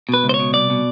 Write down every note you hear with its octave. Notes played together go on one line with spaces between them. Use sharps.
B2 B4
C#2
C5
C#5
B2
C2 D5
B2